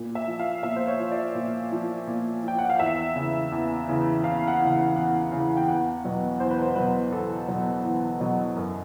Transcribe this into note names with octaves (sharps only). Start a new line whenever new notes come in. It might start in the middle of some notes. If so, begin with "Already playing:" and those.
Already playing: A#2
E5
F3
F5
A#2 E5
C5
C#5
F3
D5
A#2
F3
A#2
F3 G5
F#5
F5
E2 E5
C#3 E3
E2
C#3 E3
E2 F5
F#5
C#3 E3
F#5
E2 F#5
C#3 E3
G5
E2 F#5
B2 F#3
E2 C5
B4
C5
B2 F#3 B4
E2 A4
B2 F#3
E2
B2 F#3
F#2